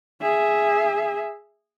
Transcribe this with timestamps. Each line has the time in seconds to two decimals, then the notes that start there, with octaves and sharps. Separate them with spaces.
0.22 G#4 E5